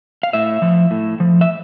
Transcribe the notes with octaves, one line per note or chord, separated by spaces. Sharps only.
F5
A2 E5
F3
A2
F3
E5